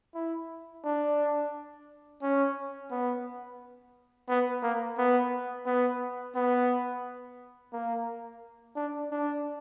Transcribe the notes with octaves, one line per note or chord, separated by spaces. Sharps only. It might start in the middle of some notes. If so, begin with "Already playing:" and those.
E4
D4
C#4
B3
B3
A#3
B3
B3
B3
A#3
D4
D4